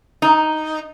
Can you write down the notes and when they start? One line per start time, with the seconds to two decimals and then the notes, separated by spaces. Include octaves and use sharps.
0.22 D#4